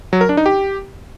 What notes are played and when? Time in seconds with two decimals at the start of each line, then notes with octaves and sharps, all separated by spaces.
0.13 F#3
0.21 A#4
0.29 D4
0.37 D#4
0.46 G4